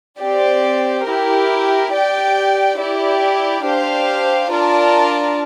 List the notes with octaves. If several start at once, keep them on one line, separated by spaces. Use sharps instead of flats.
C4 G4 D5
E4 G4 A#4
G4 D5 G5
E4 G4 D5
D4 G4 C5 F5
D4 F4 A#4 D5 A5